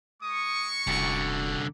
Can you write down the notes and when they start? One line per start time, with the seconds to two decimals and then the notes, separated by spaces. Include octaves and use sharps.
0.22 G#3 C#6 D#6
0.87 D#1 C2 D3 F#4